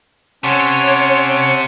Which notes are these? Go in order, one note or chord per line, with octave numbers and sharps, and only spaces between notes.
C3 C#4 C#5 F#5 A5 C6 C#6